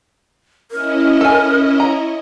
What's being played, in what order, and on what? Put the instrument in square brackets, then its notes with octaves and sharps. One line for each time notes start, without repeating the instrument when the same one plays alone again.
[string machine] C#4 E4 D#5 [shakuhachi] A#4
[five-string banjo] A4 G#5
A#5